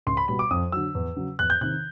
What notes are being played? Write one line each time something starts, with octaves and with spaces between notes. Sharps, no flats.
C#2 C6
B5
B2 G3 B5
D6
F2 D#6
D3 F#3 E6
E2
C#3 F#3
E2 F#6
G6
C3 D#3 F#6